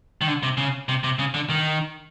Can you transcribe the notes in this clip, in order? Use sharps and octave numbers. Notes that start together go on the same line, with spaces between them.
D#3
D3
C3
C#3
C3
C3
C#3
D3
D#3